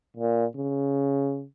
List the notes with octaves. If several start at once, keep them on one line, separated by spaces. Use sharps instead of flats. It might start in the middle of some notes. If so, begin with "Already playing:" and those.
A#2
C#3